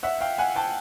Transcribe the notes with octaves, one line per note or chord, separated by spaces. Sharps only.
E5 F#5
F5 G5
F#5 G#5
G5 A5